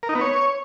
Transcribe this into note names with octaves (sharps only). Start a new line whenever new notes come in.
A#4
D#4
B3
C#5